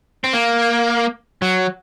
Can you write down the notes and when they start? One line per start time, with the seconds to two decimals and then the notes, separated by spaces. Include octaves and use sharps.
0.24 C4
0.33 A#3
1.42 F#3